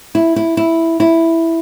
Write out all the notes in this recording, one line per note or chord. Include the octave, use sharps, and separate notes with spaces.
E4
E4
E4
E4